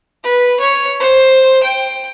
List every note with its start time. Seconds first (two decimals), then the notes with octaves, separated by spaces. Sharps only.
0.24 B4
0.60 C#5
1.00 C5
1.63 G5